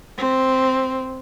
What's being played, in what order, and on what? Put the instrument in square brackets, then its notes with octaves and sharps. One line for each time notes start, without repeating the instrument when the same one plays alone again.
[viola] C4